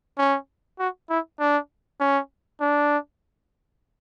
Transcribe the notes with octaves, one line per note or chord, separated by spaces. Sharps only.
C#4
F#4
E4
D4
C#4
D4